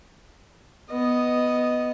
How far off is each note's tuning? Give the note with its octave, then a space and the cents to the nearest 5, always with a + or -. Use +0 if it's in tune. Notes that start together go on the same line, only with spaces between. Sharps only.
B3 +0 D#5 +0